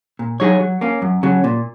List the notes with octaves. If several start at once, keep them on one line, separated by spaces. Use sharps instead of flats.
A#2
F#3 D#4 G#4 C#5
F#3
A#3 C#4
F#2
C#3 F#3
A#2